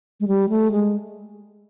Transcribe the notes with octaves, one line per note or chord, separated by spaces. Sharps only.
G#3
G3
A3
G#3